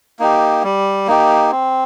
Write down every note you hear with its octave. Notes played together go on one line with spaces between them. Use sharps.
A#3 D#4 G4
G3
A#3 D#4 G4
C4